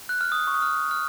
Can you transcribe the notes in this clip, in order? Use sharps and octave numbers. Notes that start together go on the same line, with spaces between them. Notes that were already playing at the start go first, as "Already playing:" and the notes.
F#6
F6
D#6
C#6
D#6
F6
F6